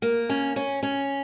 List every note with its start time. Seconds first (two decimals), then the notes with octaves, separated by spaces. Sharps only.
0.02 A#3
0.30 C#4
0.56 C#4
0.83 C#4